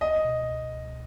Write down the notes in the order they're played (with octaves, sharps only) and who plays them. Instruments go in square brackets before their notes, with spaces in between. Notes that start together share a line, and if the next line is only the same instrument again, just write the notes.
[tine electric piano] C#2 [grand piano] D#5
[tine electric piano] B2
C#2
C#2